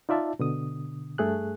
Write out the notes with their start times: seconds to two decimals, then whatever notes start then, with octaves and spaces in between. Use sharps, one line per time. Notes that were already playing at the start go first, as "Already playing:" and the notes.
0.09 D#4 F4 D5 E5 A5
0.39 B2 D3 D#6
1.18 G2 A3 G#4 F#6